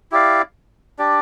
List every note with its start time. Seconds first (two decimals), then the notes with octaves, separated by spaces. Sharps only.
0.12 E4 G4 D5 F5
0.99 D4 G4 D5